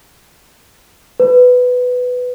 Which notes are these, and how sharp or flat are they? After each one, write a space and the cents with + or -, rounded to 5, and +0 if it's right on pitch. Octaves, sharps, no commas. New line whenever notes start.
B4 +10